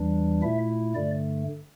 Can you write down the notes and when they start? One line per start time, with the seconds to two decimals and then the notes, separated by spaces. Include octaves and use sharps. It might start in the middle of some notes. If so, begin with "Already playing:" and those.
Already playing: E2 E3 G3 D4
0.42 A#2 A3 E4 E5
0.95 G2 D3 A3 D5